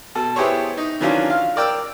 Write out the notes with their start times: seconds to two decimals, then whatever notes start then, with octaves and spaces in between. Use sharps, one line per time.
0.15 B2 A4
0.36 B3 E4 G4 G#4 C5 C#5
0.77 D#4
1.00 D#3 E3 F#3 C#4 D4 F4
1.30 F4 F5
1.56 A#4 D5 G5 E6